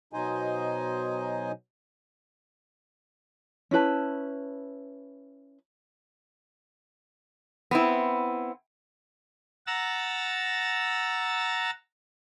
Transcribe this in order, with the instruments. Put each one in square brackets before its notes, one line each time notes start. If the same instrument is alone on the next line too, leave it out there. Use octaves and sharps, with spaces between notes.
[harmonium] B2 F#3 D#4 C5 D#5 G#5
[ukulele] C#4 E4 B4 A5
[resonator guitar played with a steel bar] B3 C4 E4
[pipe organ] F#5 A#5 E6 A6